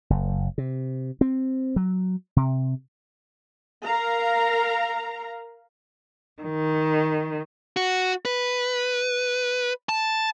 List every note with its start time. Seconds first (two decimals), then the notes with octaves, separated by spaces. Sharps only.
0.10 F#1
0.58 C3
1.21 C4
1.76 F#3
2.36 C3
3.84 A#4 F5 A#5
6.42 D#3
7.77 F#4
8.25 B4
9.89 A5